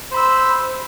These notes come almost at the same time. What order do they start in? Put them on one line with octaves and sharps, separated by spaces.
C5 B5 E6